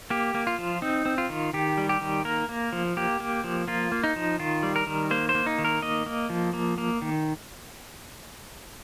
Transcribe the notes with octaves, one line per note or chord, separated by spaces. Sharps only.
A#3 G4
A#3
F4
F3
C4 D#4
C4
F4
D#3
D#3 G4
G3
G4
D#3
A#3 A#4
A#3
F3
A#3 G4
A#3
F3
A#3 F4
A#3
D#4
F3
D#3 F4
G3
A#4
D#3
A#3 C5
C5
A#3
D#4
D#3
A#4
A#3 D#5
A#3
F3
A#3
A#3
D#3